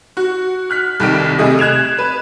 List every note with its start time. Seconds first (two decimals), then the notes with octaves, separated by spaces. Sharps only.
0.17 F#4
0.70 F6 F#6 B6
1.00 C2 D#3 A4 D7
1.38 C3 G3 A3 G#4 D#5 E5
1.59 F#6 G#6 E7 F7
1.98 B4